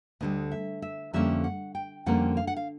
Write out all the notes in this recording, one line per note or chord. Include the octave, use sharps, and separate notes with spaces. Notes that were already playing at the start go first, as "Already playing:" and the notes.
D2 D3 G3 D#5
E5
E5
F2 D3 G3 A#3 C#4 E5
F#5
G5
F2 D3 G3 A#3 C#4 F#5
F5
F#5
F5